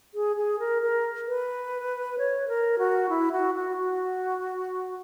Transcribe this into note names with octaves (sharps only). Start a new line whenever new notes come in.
G#4
G#4
A#4
A#4
B4
C#5
A#4
F#4
E4
F#4
F#4
F#4